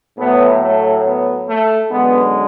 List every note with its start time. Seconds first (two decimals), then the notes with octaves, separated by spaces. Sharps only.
0.17 A2 F#3 A3 B3
0.61 A3
1.04 B3
1.47 A3
1.90 F#2 D3 G#3 B3